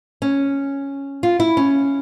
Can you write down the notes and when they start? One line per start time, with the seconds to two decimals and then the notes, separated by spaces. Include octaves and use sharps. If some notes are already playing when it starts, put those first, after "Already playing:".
0.22 C#4
1.23 F4
1.40 E4
1.57 C#4